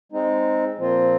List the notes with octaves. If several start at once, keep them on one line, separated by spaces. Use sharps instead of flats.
G#3 C4 D#4
A#2 F3 C4 F4